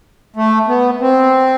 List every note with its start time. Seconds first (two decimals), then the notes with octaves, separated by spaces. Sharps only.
0.36 A3
0.68 B3
1.01 C4